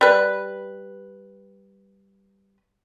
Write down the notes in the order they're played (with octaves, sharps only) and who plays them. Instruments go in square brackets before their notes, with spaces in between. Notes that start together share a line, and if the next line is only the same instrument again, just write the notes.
[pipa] G3 B4